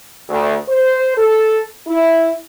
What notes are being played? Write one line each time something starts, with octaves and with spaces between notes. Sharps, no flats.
D2
C5
A4
E4